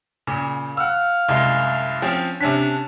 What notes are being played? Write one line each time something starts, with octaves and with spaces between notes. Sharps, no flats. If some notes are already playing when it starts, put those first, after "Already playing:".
A#2 C#3
F5 F#5 E6
C2 F#2 G#3
F3 C4 C#4
C3 C#4 D4 B6